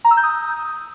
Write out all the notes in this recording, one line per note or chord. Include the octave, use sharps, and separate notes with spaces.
A#5
E6
G6
D#6